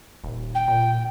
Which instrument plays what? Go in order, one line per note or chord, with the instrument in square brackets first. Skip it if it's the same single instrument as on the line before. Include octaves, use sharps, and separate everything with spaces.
[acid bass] D#1
[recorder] G5
[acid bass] A#2